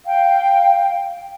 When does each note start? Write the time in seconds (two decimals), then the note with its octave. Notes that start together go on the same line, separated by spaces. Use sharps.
0.05 F5 G5